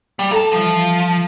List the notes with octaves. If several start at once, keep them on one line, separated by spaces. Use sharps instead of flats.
G3
A4 A5 A#5
E3 F3 G3